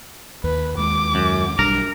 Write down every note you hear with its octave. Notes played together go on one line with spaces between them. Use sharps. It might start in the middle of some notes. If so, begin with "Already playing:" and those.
D#2 B4
D#2 G#3 D6
F#2
B1 G3 D4 A#4